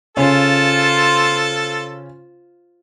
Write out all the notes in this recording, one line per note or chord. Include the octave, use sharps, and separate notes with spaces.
C#3 C#4 F4 A4 C5